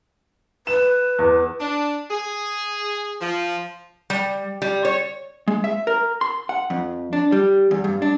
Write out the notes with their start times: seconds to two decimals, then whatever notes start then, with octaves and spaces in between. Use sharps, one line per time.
0.67 B4 E7
1.19 E2
1.60 D4
2.11 G#4
3.21 F3
4.10 G3
4.62 G3
4.85 C#5
5.48 G#3
5.64 E5
5.87 A#4
6.21 C6
6.49 F#5
6.70 F2
7.13 D4
7.32 G3
7.71 E2
7.84 G2
8.02 D4